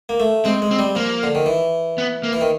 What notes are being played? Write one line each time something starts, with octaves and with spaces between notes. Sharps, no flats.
A#3
A3
G#3 C4
G#3
C4
G3
F3 A#3
D3
D#3
E3
B3
A#3
E3
D#3